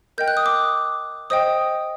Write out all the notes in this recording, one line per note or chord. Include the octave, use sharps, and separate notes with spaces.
A#4 D#5 G5 G6
F#6
D#6
D6
C5 D#5 G5 D#6